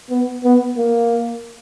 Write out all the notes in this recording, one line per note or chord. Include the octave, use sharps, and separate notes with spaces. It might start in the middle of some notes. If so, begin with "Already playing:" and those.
B3
B3
A#3